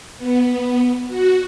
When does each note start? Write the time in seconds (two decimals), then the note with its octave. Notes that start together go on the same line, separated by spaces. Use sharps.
0.18 B3
1.08 F#4